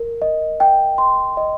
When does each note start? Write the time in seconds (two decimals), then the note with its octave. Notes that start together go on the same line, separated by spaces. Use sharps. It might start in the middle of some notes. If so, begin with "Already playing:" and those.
Already playing: A#4
0.22 D#5
0.60 G5
0.98 C6
1.37 D#5